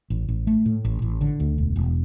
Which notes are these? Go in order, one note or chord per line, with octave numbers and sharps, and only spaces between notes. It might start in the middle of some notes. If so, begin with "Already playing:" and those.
A1
A1
A3
A2
A1
A1
D3
D2
E1
E1